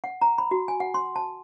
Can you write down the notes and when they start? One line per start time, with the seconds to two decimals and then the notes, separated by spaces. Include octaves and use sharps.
0.04 F#5
0.21 A#5
0.38 B5
0.51 F#4
0.68 G#5
0.80 F#5
0.94 C6
1.16 A5